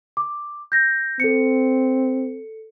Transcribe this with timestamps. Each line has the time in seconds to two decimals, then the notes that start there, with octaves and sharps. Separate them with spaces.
0.17 D6
0.72 G6 A#6
1.20 C4 A4 C#7